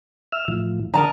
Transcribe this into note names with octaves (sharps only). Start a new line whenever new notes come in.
E5 E6 F6
A2 E3 F3
D3 A#4 D5 A5 A#5 D#6